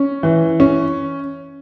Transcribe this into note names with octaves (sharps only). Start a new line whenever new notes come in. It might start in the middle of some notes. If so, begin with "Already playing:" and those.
Already playing: C#4
E3
C#4